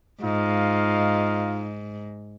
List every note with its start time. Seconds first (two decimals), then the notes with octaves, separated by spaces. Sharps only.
0.23 G#2 D#4 F4 F5